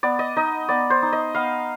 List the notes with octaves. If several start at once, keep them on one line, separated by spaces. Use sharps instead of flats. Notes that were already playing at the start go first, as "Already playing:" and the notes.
B3 D5
D#5
D#4 D#5
B3 D5
C5
D#4
D#5
B3 F5